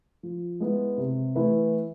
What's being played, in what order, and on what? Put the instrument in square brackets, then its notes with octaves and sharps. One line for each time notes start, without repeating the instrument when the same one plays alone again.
[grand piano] F3
G#3 B3 E4
C3
E3 A3 E4 B4